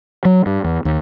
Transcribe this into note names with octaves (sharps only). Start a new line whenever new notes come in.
F#3
G2
E2
D#2